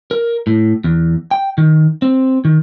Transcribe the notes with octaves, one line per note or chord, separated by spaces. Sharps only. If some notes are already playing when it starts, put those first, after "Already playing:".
A#4
A2
E2
G5
D#3
C4
D#3